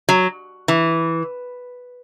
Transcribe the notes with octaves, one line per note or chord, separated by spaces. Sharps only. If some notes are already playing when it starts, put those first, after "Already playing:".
F#3
E3